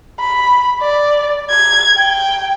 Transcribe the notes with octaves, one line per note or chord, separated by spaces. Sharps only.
B5
D5
G#6
G5